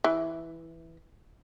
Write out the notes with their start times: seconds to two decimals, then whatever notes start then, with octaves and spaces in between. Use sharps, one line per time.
0.04 E3